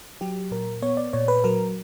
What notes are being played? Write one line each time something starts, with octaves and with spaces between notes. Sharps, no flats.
F#3 G4
A#2 A#4
B3 C#5
D5
A#2 C#5
B4
F#3 A#4